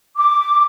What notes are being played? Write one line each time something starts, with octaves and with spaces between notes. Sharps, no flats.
D6